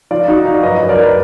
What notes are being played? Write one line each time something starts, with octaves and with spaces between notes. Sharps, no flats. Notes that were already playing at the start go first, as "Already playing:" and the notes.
F3 D5 F5
F3 D#4 F#4
F3 D5 F5
F#2 B4 D#5
F#2
A#4 D5
F3
B4